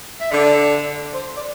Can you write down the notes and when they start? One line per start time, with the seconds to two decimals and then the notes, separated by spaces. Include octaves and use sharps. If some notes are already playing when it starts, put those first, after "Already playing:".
0.20 E5
0.31 D3 D5
1.14 C5
1.37 D5